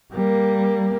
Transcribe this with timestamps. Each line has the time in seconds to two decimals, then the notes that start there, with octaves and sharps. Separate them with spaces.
0.12 G3 A#3